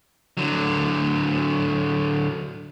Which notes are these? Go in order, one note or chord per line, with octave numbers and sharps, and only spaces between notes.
D3 F#3